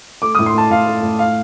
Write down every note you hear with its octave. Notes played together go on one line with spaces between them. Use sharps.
A3 D6
D#6
A2
C6
A3 A5
A2 F5
A3
A2
F5